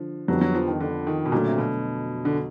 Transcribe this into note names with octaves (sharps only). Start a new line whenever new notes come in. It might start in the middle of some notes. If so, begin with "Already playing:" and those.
Already playing: D3 F3
F2 D3 F#3 G3 B3
F#3
F3
D#3
D3
D#3
B2
A#2 D3 F#3 A3
C3
B2
D3